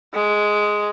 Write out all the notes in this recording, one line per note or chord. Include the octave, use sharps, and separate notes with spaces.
G#3